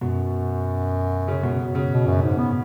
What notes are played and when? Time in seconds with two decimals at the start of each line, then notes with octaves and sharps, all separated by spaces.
0.01 F#2 B2
1.28 C#3
1.43 B2
1.60 C#3
1.75 C#3
1.91 B2
2.07 F#2
2.22 G#2
2.38 B3